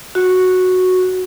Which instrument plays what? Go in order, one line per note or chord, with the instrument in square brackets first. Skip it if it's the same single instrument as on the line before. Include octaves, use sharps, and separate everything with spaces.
[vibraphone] F#4